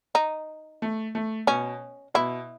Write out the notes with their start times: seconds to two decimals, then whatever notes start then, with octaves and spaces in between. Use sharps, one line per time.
0.15 D#4
0.82 A3
1.15 A3
1.47 B2 C#4
2.14 B2 E4